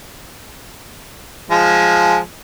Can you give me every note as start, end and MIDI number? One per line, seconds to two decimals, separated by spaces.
1.51 2.18 53
1.51 2.18 56